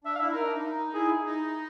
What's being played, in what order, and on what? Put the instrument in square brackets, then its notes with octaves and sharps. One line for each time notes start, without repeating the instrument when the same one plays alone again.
[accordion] D4 [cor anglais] E5
[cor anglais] F5
[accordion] E4 [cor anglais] E5
[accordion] D#4 [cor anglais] A#4
[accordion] D4
D#4
[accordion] E4 [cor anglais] G#4
[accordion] D#4